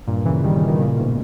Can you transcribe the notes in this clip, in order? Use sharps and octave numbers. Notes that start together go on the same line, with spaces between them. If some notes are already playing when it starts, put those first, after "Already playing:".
G2 A#2
C#3 E3
D#3 G3
C#3 E3
B2 D#3
A#2 C#3
G#2 B2